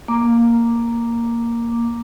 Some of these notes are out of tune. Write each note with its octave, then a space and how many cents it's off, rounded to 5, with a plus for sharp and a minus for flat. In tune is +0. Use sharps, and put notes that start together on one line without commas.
A#3 +0 D6 +0